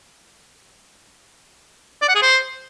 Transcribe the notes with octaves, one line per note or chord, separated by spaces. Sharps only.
D5
F#5
G#4
C5